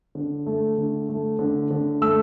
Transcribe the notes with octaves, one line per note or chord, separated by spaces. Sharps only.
D3
A3
D3
A3
D3
D3
A3 E6